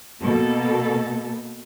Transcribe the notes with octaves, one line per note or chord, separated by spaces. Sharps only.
B2 A#3 A4